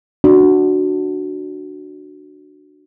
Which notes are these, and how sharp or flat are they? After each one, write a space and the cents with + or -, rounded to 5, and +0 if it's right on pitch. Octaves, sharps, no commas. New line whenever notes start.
D4 +15 F#4 +0